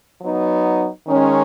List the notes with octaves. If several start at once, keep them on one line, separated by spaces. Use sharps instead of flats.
F#3 B3 D#4
D#3 G#3 C#4